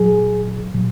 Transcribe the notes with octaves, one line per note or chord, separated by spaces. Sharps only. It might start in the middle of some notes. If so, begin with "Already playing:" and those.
Already playing: A#2 F#3 G#4
A#2 F#3